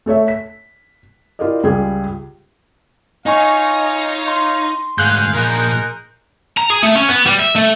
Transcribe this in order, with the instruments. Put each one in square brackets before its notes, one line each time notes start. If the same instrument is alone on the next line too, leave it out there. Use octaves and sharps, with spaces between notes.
[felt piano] A3 A4 C#5 E5
B6
E4 F4 G4 A#4 D5 D#5
C#2 G3 F4 G#4
[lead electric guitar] D#4 [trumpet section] F4 C#5 F5 [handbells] D#5 G#5 C#6
[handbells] C6
[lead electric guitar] D2 G#2 [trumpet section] G#4 F5 [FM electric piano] F#6 G6
[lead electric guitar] A#2 F3 [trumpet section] D#4 G#4 A#4
[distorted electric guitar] A#5
G#4
A3
C#4
B3
G3
E5
A3